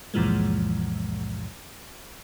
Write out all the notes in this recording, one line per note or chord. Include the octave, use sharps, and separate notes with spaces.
C#2 F#2 A#2 E3 F3 G#3